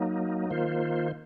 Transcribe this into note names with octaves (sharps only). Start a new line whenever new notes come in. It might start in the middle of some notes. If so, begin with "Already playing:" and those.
Already playing: F#3 A#3 D#4
D#3 A#3 F4 C5